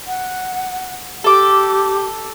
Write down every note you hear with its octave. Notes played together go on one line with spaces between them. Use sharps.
F#5
G4 A4 D6